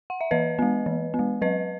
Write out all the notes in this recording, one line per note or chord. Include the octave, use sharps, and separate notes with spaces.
F#5
E5
E3 B4 D#5
G#3 B3
E3
B3
G#3
F#3 B4 D#5